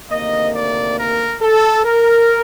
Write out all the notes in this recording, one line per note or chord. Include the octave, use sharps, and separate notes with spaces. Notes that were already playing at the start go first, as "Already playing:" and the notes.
D2 C3 D#3 A#3 D#5
D5
A#4
A4
A#4